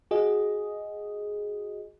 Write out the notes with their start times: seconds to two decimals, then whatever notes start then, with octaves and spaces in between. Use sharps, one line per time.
0.11 F#4 G#4 D#5